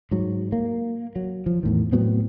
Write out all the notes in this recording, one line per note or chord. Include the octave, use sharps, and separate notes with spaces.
G#2 F#3
A#3
F#3
F3
E2 A2 D#3
A2 F#3 B3 C4